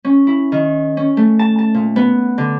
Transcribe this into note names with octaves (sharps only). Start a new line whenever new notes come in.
C#4
E4
D#3
C#4
A3
A5
A5
A#2
B3
D3